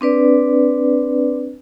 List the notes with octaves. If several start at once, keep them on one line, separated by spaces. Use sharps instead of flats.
C4 D4 B4 D5